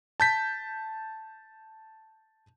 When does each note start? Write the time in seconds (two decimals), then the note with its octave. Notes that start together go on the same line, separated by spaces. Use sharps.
0.20 A5 G6 B6